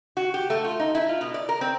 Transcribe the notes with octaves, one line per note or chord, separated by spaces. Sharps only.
F#4
G4
A3
F4
D#4
E4
F4
B2
D5
A#4
C4